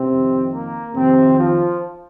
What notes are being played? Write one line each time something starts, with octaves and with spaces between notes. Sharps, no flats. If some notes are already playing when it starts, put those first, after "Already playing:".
Already playing: C3 C4
F2 D#3
A#3
F2 C3 D#3 C4
F3 F4